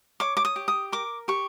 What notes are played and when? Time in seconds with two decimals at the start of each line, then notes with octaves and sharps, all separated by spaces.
0.20 C#5 D6
0.37 D6
0.45 D#6
0.56 G4
0.68 D#6
0.92 A#4 D6
1.28 G4 C#6